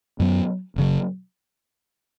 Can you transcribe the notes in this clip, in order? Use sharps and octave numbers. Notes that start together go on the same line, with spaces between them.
F#2 F#3 B3
F#1 E2 C#3 F#3